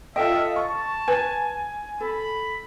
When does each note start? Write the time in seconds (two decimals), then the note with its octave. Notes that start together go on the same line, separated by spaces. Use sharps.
0.16 F4 A4 D#5 E5 G5
0.56 A5 C#6
1.08 B4 G#5
2.01 A4 B5